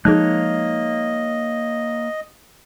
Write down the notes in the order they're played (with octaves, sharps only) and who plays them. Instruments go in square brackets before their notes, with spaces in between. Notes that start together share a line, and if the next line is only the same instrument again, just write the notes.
[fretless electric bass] F3 G#3 [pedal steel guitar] A#3 C#5 F#6 [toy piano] D#4 G#4 [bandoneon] D#5